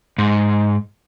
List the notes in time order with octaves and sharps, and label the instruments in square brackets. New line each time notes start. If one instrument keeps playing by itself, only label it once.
[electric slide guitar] G#2